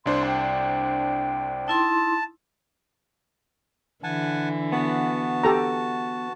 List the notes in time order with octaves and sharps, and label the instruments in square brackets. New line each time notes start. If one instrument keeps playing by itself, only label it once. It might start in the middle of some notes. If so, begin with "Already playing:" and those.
[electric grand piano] C2 D4 C5 [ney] C6
[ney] G5
[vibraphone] D#4 E4 C6 [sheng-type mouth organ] A5
[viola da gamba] D3 E3 [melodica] F#5 G#5 A5
[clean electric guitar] B3 [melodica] F#4 A5
[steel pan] G4 A4 A#5